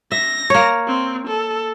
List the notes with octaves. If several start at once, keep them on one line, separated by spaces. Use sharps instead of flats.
E5 A#6
A#3 C#5
C4
A4